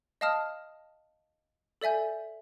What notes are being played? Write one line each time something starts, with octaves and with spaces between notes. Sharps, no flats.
D#5 F5 A5 D#6 F6
A4 D5 E5 G#5 G6